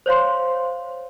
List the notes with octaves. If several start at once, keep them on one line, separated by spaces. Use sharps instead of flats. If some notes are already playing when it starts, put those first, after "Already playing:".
C5 C#5 F5 C6